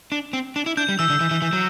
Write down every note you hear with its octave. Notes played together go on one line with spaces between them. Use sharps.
D4
C4
D4
E4
D4 G6
G3
E3 E6
D3
E3
E3
E3
F#3